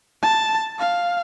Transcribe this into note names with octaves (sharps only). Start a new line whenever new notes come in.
A5
F5